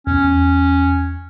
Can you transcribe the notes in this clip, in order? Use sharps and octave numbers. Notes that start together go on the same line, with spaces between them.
E2 C#4